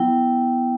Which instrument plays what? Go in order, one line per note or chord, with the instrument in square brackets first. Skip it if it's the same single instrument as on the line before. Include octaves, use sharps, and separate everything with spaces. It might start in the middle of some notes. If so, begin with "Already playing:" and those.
Already playing: [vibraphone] F#3 B3 E4 G5